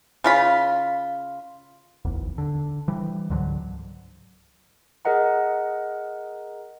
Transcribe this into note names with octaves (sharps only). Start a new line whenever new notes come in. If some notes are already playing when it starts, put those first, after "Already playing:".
C#3 F4 B5
D1 G#1 E2
D3
E3 G3
C#2 G#2 D3 F#3
G#4 A#4 D#5 F#5 A#5